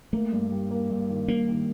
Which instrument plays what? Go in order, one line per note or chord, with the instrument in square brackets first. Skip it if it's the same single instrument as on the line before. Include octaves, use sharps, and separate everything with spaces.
[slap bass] A3 [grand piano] A#3
[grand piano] G2
G3
A#3
G2
D#3
[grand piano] G2 [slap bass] A#3
[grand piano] D#3